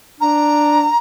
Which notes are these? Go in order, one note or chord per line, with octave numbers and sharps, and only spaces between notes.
D4 A#5